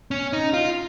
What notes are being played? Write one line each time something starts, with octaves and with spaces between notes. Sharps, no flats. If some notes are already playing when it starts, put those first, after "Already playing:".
C#4
D#4
F4